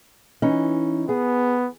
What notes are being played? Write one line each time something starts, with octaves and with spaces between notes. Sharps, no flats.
E3 C#4 D#4
B3 G#4